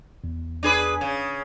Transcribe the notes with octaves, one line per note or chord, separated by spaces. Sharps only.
E2
D4 G#4 B4
C#3